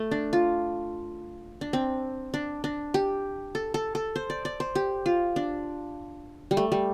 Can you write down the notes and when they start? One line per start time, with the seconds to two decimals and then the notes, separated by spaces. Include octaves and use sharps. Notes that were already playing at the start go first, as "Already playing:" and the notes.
Already playing: A3
0.11 D4
0.33 F4
1.61 D4
1.73 C4
2.34 D4
2.64 D4
2.94 G4
3.55 A4
3.74 A4
3.95 A4
4.16 C5
4.30 D5
4.45 D5
4.60 C5
4.75 G4
5.06 F4
5.36 D4
6.51 G3
6.57 A3
6.72 G3